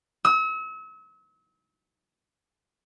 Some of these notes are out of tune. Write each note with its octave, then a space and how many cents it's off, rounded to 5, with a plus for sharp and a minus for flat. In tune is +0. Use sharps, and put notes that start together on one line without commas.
E6 -40